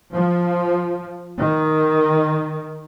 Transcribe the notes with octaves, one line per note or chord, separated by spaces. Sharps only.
F3
D#3